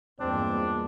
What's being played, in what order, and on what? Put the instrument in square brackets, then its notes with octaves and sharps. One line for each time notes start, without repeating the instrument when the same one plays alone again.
[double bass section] E2 G2 A#3 [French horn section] G#3 F4 D5 [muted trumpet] C4 [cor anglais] D4